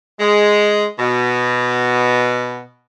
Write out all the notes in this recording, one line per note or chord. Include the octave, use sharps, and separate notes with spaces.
G#3
B2